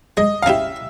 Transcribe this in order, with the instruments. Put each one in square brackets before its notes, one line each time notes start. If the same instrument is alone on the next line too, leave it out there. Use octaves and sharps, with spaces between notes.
[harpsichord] G#3 [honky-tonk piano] D#5
[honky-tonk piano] F5
[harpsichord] C#4 E4 G4 [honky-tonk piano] E5